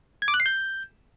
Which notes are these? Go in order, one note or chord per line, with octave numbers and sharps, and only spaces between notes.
G#6
D6
F#6
C7
G6